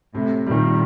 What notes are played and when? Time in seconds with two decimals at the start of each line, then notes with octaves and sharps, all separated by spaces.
0.15 A2 C3
0.47 A#2 D#3 G3